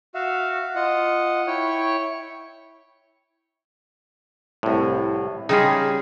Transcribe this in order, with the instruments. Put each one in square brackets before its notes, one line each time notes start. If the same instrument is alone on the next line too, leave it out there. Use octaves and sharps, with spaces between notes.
[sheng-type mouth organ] F#4 E5 F5
F4 D#5 F#5
E4 C#5 G5 C#6
[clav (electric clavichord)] C2 A2
[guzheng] C#3 G3 F4 [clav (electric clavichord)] D#4 G#4